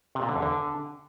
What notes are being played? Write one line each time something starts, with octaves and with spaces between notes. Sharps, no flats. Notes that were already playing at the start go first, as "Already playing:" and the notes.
C3
A#2
D3
E2
D3